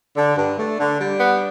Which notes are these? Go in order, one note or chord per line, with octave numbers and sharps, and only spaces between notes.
D3 D4
G2
A3
D3
G3
B3